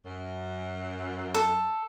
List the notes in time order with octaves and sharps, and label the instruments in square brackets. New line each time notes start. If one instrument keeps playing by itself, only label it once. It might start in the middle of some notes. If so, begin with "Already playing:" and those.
[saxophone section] F#2
[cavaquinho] A4